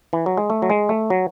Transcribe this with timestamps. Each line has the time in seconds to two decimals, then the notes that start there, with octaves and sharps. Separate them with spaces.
0.13 E3
0.26 F#3
0.37 G#3
0.50 A3
0.62 F#3
0.70 G#3
0.89 A3
1.10 F#3